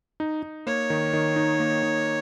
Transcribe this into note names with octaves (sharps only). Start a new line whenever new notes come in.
D#4
D#4
A#3 C#5
D#3
D#3
D#4
A#3
D#3